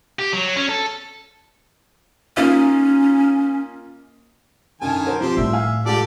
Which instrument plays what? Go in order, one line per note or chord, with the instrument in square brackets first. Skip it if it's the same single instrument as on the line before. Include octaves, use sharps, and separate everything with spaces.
[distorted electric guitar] G4
F#3
C#4
A4
[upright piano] A#3 D#4 F4 [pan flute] C#4
[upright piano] F#2 D3 [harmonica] D#3 G#5 A5
[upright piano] F#3 A#4 C5
[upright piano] F3 C4 [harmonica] G4 C5
[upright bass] A2 D#3 [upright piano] F3 G3 [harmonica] E5
[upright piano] F5 G#5 F6
[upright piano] G#2 F4 [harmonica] G4 A4 D5